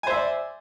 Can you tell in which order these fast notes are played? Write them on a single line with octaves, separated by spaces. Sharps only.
G#5 C5 E5 D5